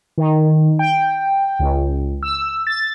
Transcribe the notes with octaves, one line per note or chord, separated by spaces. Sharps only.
D#3
G5
C#2
E6
A6